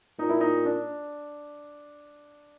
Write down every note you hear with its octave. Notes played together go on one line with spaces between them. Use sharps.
A#2 D#4
E4
D#4
D4